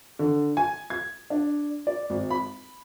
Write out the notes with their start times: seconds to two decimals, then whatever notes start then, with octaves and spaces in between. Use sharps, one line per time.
0.19 D3
0.57 G#5
0.90 G#6
1.30 D4
1.87 D5
2.10 G#1
2.30 B5